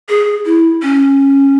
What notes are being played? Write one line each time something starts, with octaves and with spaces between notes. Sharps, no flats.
G#4
E4
C#4